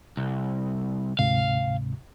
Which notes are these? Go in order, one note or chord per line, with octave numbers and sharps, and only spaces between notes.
C2
D2 G#2 C3 F5